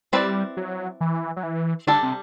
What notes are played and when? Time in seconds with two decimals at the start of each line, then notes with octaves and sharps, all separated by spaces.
0.12 G3 C4 E4 B4 D5
0.57 F#3
1.01 E3
1.36 F#3
1.43 E3
1.87 D3 G3 D4 A4 D5
2.03 C3